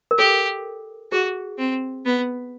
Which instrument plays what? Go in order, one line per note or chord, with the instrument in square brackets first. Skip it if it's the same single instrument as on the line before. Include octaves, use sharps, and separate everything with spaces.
[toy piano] A#4
[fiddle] G4 [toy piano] A4
[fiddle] F#4 [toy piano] G#4
[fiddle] C4
B3